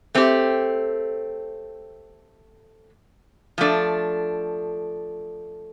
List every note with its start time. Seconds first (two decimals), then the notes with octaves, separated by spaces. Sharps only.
0.15 A3 C4 G4
3.58 F3 A3 D4